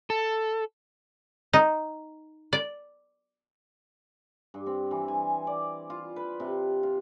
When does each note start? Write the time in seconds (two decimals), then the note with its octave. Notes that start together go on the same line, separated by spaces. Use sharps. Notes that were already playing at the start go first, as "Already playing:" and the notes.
0.10 A4
1.53 D#4
2.53 D5
4.54 G2
4.66 C4
4.91 E3
5.08 G#5
5.47 D5
5.90 F4
6.16 B4
6.40 C3
6.83 F4